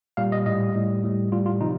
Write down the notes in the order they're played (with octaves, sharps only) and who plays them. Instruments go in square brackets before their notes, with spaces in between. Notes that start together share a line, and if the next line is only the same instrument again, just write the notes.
[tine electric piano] A#2 G3 F5
D#5
A2 G3 D#5
A2 G3
A2 G3
A2 G3 F4
F4
C3 F3 D#4